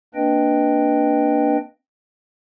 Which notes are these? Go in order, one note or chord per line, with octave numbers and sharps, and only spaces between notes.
A#3 C4 D4 B4 D#5 G5